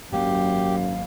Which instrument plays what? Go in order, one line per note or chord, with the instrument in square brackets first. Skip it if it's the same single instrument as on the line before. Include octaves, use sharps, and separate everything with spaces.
[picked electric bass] G#1 F#3 A#3 [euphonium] F#2 [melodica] G4 [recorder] F5